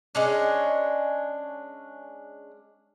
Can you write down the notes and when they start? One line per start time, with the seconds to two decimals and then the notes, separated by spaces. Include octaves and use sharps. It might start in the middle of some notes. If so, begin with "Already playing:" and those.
0.15 G#3 C#4 D4